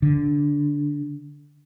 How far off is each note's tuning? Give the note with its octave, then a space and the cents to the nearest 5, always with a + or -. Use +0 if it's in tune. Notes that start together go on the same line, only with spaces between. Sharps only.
D3 -10